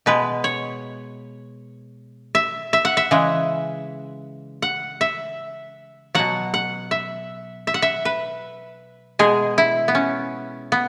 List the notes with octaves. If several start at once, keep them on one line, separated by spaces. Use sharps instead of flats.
B2 G#3 B4
C#5
E5
E5
F#5
E5
C#3 E3 G#3
F#5
E5
B2 F#3 F#5
F#5
E5
E5
F#5
E5
B4
B2 G#3 G#4
E4
B3
C#4
B3